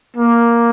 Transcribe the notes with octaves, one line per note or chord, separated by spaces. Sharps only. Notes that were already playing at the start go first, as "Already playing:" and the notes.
A#3